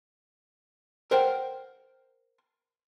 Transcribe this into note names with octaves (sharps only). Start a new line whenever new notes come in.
A#4 C5 F#5 G5